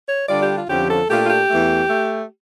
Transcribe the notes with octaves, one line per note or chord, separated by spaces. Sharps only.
C#5
D3 G3 D4 F4 D5
G4
F4
F2 D3 F3 C#4 G4
A4
A#2 A3 D4 F4 G4
F4
G4
E2 E3 A3
A3